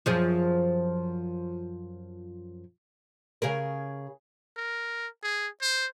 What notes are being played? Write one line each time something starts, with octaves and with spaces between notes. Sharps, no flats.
F#2 F3 G#4
C#3 G#4 A#4
A#4
G#4
C5